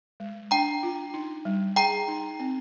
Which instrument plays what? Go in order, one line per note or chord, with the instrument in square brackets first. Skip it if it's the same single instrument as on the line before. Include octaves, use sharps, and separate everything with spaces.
[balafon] G#3
[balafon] D4 [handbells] G5 A#5
[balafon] F4
D#4
G3
[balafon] G#4 [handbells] G5 A#5
[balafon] D#4
C4